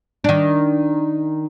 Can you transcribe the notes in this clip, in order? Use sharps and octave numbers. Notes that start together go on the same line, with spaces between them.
D#3 D4